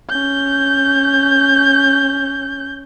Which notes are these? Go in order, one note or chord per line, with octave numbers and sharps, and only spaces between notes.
C#4 G6